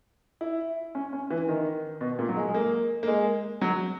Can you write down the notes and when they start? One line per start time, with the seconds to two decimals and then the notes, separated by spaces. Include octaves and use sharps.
0.41 E4
0.95 C#4
1.13 C#4
1.31 E3
1.48 D#3
2.01 B2
2.19 A#2
2.29 F#3
2.37 G#3
2.48 G#3
2.54 A#3
3.03 A#3
3.07 G#3
3.61 F#3